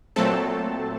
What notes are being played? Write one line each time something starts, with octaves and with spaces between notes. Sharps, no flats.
A#2 F#3 A3 C4 A4 A5